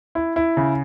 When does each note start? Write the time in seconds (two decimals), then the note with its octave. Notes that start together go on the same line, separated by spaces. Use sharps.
0.15 E4
0.36 E4
0.57 C#3